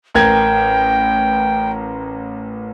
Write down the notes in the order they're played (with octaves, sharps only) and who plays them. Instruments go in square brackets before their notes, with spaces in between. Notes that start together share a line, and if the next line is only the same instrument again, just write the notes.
[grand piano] A1 A#4 G#6 [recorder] G5